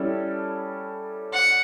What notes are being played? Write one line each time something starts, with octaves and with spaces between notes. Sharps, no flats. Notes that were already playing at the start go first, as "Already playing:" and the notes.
Already playing: G3 C#4 E4 A4
F#5